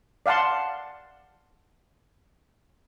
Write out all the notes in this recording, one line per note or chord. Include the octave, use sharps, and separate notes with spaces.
D5 F5 F#5 A5 C6